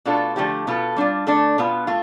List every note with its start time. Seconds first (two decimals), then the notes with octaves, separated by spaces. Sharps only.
0.05 B2 A3 D4 F4 A4
0.36 D3 F3 A3 E4 G4
0.67 B2 B3 F4 A4
0.97 G3 D4 F4
1.27 D3 A3 D4 A4
1.58 B2 B3 F4
1.87 A3 F4